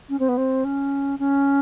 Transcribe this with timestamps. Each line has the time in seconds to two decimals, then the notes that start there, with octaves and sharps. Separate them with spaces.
0.09 C#4
0.19 C4
0.29 B3
0.38 C4
0.65 C#4
1.19 C#4